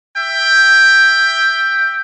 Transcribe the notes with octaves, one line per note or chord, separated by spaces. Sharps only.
E5 G5